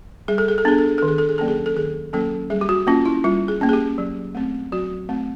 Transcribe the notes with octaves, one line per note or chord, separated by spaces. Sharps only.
G3 G#4
A4
G#4
A4
B3 D4 G#4
A4
G#4
D#3 A4
G#4
A4
G#4
F#3 A#3 C#4 A4
G#4
A4
D#3 G#4
F#3 A#3 C#4 A4
G3 G#4
G4
F#4
A#3 C#4 F4
E4
G3 F4
G#4
A#3 C#4
G#4
G4
F#3
A3 C4
F#3 F#4
A3 C4